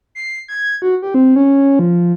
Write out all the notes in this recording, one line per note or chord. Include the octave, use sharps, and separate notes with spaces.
C7
G#6
F#4
G4
C4
C#4
F3